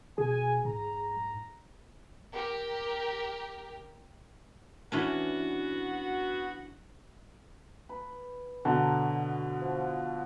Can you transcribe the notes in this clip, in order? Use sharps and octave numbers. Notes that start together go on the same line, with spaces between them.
B2 G#4 G#5
G#2 A#5
G4 A#4
E3 B3 C#4 D4 F#4
B4
B2 D3 C#5 A5 A#5
F3